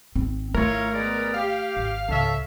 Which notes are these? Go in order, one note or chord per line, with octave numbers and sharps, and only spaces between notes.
G#1 C4
A3 E4 F4 A#4 C#5
G#3 B3 D5
G4 F5
G#1
C#2 G#2 A4 C#5 E5